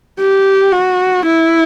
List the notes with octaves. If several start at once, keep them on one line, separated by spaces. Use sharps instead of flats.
G4
F#4
E4